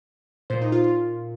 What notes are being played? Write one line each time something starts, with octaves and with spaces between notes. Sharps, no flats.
A#2 C5
D#4
F4
F4